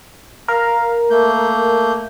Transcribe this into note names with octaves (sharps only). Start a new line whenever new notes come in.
A#4 F5
A3 A#3 G6